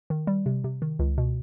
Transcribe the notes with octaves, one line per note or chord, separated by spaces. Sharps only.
D#3
G3
C3
C3
D#3
C#2
B2